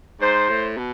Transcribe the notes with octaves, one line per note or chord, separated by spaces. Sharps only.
G#2 C5
A2
B2